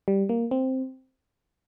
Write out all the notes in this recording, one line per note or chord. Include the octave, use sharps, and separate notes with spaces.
G3
A#3
C4